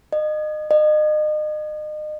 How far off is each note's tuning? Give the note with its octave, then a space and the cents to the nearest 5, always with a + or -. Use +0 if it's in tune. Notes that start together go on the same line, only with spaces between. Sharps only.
D#5 -30
D#5 -35